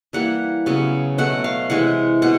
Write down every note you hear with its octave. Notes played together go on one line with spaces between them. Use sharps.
E3 G3 A#3 F#5
C#3 F#3 B3
B2 F#3 A3 F#5
F5
C3 E3 G#3 F#5
B2 F#5